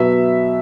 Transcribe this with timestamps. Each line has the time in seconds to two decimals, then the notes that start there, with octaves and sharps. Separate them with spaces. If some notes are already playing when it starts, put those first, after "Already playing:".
Already playing: B2 F#3 B3 E5